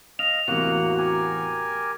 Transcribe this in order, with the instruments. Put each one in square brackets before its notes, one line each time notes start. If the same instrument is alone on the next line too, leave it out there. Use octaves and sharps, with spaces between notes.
[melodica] D#5 F5 [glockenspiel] F7
[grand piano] E2 A2 C3 [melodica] A#3 F#5 [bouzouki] F#4
[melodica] G4 A#4 G#5